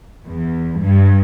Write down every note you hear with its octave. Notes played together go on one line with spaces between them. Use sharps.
E2
G2